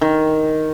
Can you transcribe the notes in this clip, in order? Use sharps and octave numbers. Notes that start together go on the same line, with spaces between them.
D#3